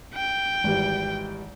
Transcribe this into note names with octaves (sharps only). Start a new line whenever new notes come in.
G5
G#1 E3 G3